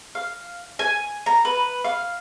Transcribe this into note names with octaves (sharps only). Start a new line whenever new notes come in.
F5
G#5
A#5
B4
F5